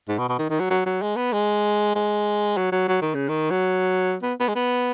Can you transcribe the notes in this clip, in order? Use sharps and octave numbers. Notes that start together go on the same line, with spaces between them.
G#2
B2
B2
D#3
D#3
F#3
F#3
F#3
G#3
B3
G#3
G#3
F#3
F#3
F#3
D#3
C#3
D#3
F#3
B3
B3
G#3
B3